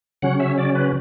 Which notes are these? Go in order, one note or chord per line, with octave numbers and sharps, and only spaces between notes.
C#3 F#3 C#4 F#5
E5
D5
B4